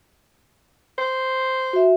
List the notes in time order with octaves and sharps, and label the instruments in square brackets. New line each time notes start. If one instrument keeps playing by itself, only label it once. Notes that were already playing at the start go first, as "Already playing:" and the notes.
[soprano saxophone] C5
[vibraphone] F#4 E5